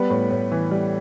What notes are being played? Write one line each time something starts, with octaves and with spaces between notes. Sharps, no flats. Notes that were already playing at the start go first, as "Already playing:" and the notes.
Already playing: G3 B3 B4
A2
A2
E3
G3